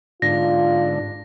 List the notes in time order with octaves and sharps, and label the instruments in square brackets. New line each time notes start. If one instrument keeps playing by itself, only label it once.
[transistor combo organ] G#2 D3 D4 [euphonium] F4 [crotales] A#6